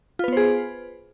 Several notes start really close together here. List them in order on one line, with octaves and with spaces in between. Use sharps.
F4 B4 B3 C5 G#4